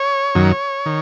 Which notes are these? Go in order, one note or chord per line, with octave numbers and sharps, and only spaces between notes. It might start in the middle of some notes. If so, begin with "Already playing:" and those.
Already playing: C#5
F#2 D#3 F#3
D#3